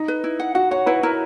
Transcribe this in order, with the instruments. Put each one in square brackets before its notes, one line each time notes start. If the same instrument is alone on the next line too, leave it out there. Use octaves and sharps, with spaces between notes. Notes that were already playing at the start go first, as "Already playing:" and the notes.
Already playing: [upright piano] D#4
[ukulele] B4
E4
F#5
[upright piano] F#4 [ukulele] F#5
[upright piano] C#5 [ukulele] F#5
[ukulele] E4 [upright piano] B4
[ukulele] E4 [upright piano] A#4